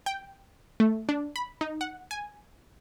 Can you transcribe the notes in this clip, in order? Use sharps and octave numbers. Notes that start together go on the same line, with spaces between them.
G5
A3
D4
B5
D#4
F#5
G#5